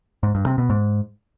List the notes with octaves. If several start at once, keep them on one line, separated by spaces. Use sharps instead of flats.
G#2
G2
C3
B2
G#2